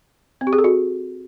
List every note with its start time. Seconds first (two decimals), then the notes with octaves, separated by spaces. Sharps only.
0.41 C4
0.47 G4
0.53 G#4
0.58 A4
0.64 F#4